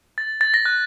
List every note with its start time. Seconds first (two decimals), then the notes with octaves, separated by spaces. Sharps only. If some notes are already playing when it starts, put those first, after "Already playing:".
0.18 A6
0.41 A6
0.54 A#6
0.66 F#6